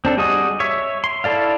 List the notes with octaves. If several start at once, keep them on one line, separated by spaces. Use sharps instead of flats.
C4 D4 A4
G3 F#4 G#4 D#5 D#6
C#5 E5
C6
E4 A4 D5 F5